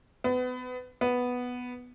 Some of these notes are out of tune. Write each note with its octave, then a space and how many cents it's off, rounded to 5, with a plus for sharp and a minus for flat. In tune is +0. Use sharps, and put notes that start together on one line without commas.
B3 +30
B3 +0